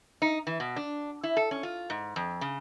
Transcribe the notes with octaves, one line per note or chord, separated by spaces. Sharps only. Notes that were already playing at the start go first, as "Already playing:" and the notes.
D#4
E3
B2
D4
E4
A4
C#4
F4
G#2
F2
C#3